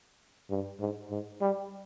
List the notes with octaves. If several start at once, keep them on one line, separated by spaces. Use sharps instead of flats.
G2
G#2
G#2
G3